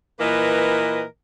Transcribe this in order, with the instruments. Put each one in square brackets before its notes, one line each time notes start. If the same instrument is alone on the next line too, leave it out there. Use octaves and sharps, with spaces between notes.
[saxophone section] A#2 E3 A#3 A#4 B4 D#5